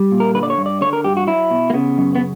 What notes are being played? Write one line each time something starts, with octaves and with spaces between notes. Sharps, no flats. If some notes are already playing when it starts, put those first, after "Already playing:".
Already playing: G3
A#2
A#4
D3 B4
D5
C#5
G2
D5
D3 C#5
A#4
G2 G4
F#4
F#3 E4
B2
A#3
C#3 B3
F#2
B3